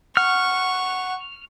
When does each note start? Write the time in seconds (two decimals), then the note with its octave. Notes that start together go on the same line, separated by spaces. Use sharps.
0.17 F#5 C#6 F6